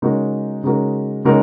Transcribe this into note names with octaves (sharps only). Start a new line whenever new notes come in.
C#3 G#3 D#4 F#4 A#4
C#3 G#3 D#4 F#4 A#4
C#3 G#3 D#4 F#4 A#4